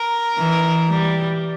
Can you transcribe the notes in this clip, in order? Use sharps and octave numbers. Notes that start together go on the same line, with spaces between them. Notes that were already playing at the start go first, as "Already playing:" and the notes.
Already playing: A#4
E3
G3